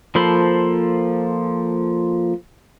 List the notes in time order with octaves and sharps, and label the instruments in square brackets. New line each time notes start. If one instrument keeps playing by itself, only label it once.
[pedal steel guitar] F3 A#3 A4 C5 B5